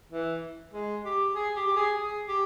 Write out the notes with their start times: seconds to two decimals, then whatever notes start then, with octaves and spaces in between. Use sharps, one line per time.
0.12 E3
0.73 G#3
1.05 G4
1.35 G#4
1.56 G4
1.68 G4
1.76 G#4
1.97 G#4
2.28 G4